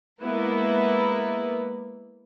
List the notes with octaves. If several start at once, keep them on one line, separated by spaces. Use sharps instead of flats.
G#3 A#3 B3 E4 A#4 B4